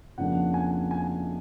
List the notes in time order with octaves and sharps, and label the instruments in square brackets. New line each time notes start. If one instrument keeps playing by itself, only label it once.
[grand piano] F2 C#3 F3 A#3 D4 F#5
G#5
G#5